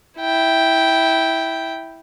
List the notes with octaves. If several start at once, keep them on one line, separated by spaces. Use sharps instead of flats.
E4 G5